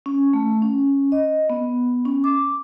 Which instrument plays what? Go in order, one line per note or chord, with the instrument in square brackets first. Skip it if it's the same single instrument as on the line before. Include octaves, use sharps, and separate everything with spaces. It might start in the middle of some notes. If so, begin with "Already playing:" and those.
[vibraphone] C#4
A3
C#4
D#5
B3
C#4
D6